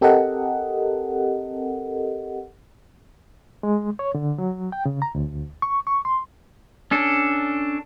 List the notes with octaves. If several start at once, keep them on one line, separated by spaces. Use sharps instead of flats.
C4 G4 A4 A#4 D#5 F#5
G#3
C#5
D3
F#3
G5
C#3
A#5
D2
C#6
C#6
C6
C#4 D4 A4